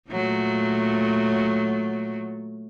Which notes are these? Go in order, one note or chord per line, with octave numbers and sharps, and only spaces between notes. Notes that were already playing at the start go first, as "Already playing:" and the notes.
A#2 F#3 A3